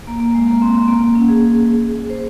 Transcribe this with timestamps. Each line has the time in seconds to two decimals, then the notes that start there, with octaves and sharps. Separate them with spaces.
0.07 A#3
0.20 A#3
0.35 G#3
0.48 A#3
0.62 C4
0.75 C4
0.88 A#3
1.01 A#3
1.15 C#4
1.29 G#4
2.10 C5